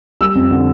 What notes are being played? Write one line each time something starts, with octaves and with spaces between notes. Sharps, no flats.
G3 E6
F2
D3